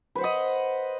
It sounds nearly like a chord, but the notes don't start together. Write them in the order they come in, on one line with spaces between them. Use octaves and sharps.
B4 C5 F#5 D#5